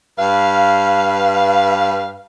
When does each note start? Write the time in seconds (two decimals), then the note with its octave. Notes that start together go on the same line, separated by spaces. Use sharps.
0.18 G2 B4 F5